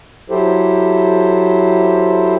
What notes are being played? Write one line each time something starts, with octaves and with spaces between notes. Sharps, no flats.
F#3 E4 G4 A4 C5